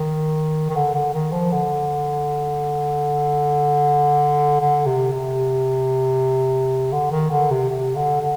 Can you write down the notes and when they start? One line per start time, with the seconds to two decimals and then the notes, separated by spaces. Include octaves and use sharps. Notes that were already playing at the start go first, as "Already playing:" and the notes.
Already playing: D#3
0.69 D#3
0.75 D3
0.94 D3
1.14 D#3
1.32 F3
1.52 D3
4.60 D3
4.86 C3
5.13 C3
6.92 D3
7.11 D#3
7.31 D3
7.51 C3
7.70 C3
7.96 D3
8.21 D3